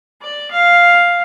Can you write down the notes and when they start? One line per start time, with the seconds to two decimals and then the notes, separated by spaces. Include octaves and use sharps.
0.22 D5
0.51 F5